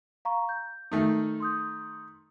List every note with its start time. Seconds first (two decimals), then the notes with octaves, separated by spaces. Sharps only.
0.25 F5 A#5 C#6
0.49 G6
0.92 D#3 A3 D#4
1.40 C6 D#6 G6